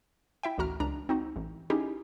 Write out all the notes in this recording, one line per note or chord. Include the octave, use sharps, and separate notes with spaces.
E4 E5 G5
A1 D2 F#4 A#5 F6
C#2 D4 A#5
C4 D#4 F#4
A1
C#4 D#4 E4 G4 G#4